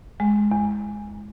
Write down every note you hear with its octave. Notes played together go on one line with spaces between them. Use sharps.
G#3
E2